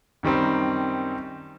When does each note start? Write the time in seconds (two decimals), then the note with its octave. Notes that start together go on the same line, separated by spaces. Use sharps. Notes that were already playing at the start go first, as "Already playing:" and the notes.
0.23 F#2 D#3 G3 C4